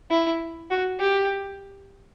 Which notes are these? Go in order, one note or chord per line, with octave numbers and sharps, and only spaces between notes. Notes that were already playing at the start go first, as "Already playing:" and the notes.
E4
F#4
G4